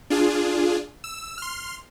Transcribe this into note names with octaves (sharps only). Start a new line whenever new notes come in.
D4 F4 G#4
E6
C6 F6